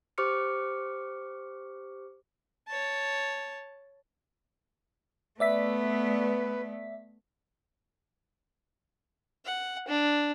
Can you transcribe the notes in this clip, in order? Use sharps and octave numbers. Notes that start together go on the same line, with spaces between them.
G4 C5 C#6 D6 F6 C#7
C#5 A5
A3 B3 B4 D5 E5 B6
F#5
D4